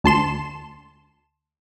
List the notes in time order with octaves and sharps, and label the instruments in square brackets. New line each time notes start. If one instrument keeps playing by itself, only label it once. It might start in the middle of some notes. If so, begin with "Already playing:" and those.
[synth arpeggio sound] D2 A5 C6 E7